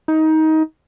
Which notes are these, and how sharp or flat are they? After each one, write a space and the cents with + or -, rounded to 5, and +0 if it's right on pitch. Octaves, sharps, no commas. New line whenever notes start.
D#4 +20